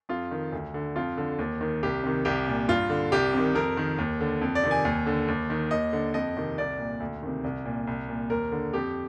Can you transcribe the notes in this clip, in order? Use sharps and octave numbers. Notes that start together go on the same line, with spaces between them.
F2 F4
D#3
D2
D3
F2 F4
D3
D#2
D#3
C2 G4
C3 D#3
C2 G4
A#2
G2 F4
D3
C2 G4
C3 D#3
F2 A#4
D#3
D#2
D3
F2
D5
C3 D#3
G#5
D#2
D3
D#2
D#3
D#2 D#5
D3
F2 D#5
C3 D#3
C2 D5
A#2
D2
C3 D#3
C2
A#2
C2
A#2
D#2 A#4
D3
F2 G4